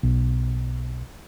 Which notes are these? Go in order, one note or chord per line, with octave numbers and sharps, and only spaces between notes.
B1